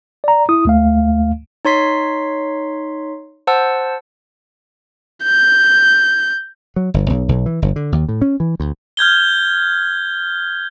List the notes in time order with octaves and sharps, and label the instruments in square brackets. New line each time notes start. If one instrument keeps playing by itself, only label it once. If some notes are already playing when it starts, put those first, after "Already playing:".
[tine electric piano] D5 A#5
E4 D#6
D2 A3 F5
[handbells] D#4 C#5 C6 B6 C7
C5 F#5 A5 E6
[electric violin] G6
[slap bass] F#3
G1
B1
B1
E3
G1
D3
D#2
A2
C#4
E3
D2
[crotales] F6 G6 G#6 G7